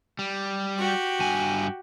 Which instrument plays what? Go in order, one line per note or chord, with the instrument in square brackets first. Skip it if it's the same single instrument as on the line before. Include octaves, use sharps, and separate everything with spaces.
[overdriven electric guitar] G3
[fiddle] F#4 G4
[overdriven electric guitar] G2 G#5